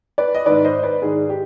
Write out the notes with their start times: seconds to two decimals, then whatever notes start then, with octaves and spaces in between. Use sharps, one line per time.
0.18 B4 D5
0.34 D#5
0.46 G#2 D#3 B4 D5
0.64 C5 D#5
0.83 B4 D5
1.02 G#2 D#3 G#4
1.29 G4